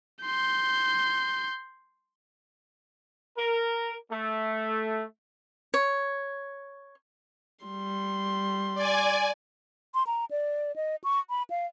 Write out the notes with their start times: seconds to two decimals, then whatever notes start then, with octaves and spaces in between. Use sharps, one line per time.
0.24 C6 G6
3.38 A#4
4.11 A3
5.74 C#5
7.65 G3 C6
8.75 D5 G#5
9.94 C6
10.07 A#5
10.31 D5
10.76 D#5
11.04 C#6
11.30 B5
11.50 F5